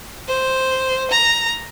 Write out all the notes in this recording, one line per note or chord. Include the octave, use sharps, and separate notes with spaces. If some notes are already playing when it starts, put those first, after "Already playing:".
C5
A#5